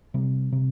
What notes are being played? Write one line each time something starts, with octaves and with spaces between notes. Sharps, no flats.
C3 G3
C3